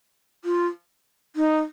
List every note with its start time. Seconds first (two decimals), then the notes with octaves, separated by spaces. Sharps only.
0.45 F4
1.36 D#4